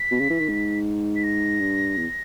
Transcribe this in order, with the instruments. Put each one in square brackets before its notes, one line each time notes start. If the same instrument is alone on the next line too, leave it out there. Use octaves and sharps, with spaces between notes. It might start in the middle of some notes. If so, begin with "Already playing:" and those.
Already playing: [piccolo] B6
[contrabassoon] B2
C#3
E3
D#3
G#2
[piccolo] B6
A#6
[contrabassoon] G2
E2